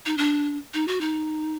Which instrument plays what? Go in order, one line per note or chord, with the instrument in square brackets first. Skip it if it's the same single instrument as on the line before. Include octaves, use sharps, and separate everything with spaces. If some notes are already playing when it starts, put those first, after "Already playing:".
[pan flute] D#4
D4
D#4
F#4
D#4